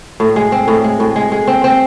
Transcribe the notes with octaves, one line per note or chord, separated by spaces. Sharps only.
A2
G#3
C4
A2
G#3
A2
G#3
G#3
C4
C4